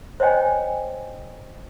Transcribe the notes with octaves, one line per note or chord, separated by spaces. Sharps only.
C5 C#5 D#5 G5 G#5